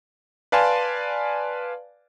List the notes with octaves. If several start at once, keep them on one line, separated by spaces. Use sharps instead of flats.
B4 D5 F5 G#5 A5 C6